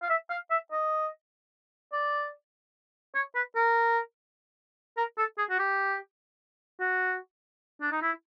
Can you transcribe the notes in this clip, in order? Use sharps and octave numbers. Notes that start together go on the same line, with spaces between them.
F5
E5
F5
E5
D#5
D5
C#5
B4
A#4
A#4
A4
G#4
F#4
G4
F#4
D4
D#4
E4